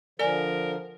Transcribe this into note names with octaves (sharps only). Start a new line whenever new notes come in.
D3 F3 A#4 D5 G#5